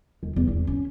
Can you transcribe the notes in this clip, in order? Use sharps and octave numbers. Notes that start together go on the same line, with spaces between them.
D#2
E2
E4
C#4